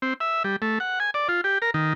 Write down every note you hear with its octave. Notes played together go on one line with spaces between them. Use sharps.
C4
E5
G3
A3
F#5
G#5
D5
F4
G4
A#4
D#3